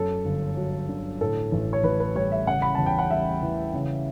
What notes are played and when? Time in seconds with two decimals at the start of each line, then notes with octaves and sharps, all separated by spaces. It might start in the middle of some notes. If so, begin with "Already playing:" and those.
Already playing: F#2 A4
0.25 G1
0.57 F#3
0.89 D3
1.21 A2 A4
1.52 A1
1.73 C#5
1.83 A1 B4
2.00 B4
2.15 G3 C#5
2.32 E5
2.47 C#3 F#5
2.62 B5
2.75 E2 A5
2.86 G5
2.99 F#5
3.10 G3 E5
3.42 E3
3.73 C#3